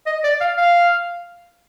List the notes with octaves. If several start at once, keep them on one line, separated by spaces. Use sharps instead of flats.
D#5
D5
F5
F5